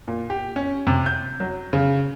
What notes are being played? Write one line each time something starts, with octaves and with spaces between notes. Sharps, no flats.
A#2
G4
C#4
C3
G6
F#3
C#3